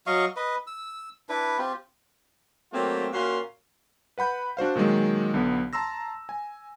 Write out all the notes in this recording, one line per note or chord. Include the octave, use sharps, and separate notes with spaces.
F#3 D#5 F5 C#6
B4 D#5
E6
D4 E4 B4
C4 F4 G4
F#3 A3 A#3 C4 F4 G4
A#2 A#3 C#4 F#4 F5 C6
B4 F#5 B5 G6
D4 F#4 C5 F5
A#2 D#3 F#3 G#3
B1 D3 B3
A5 A#5 C6 E6 A#6
G#5